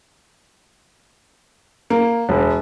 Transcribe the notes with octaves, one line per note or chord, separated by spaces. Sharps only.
A#3
E1